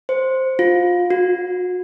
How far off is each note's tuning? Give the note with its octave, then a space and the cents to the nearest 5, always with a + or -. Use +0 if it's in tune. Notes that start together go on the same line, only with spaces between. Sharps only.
C5 +0
F4 +20
F#4 -35